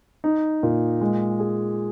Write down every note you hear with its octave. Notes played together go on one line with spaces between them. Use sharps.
D#4
A#2
G#3
G#4